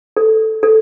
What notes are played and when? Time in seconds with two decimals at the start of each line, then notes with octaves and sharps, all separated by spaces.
0.17 A4
0.63 A4